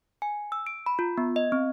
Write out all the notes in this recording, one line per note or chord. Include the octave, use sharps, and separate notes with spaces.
G#5
E6
D7
B5
F4
B3
D#5
C4